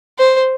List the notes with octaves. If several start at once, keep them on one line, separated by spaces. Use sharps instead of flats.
C5